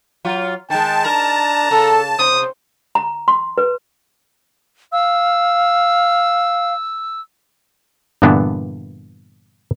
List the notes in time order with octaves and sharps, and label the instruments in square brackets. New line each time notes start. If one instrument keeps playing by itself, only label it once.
[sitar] F#3 F4
[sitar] D#3 G#3 [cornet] G5 [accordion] A5
[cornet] D4 [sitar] A#4 [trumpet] A#5
[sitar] C#3 [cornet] A4
[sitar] C3 [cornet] C5 [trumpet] D#6
[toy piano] A#5
C6
B4
[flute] F5 [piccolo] E6
[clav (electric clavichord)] G2 A#2 D3 E3 B3 D4